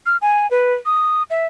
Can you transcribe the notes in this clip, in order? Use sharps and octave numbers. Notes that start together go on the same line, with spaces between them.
F6
G#5
B4
D#6
E5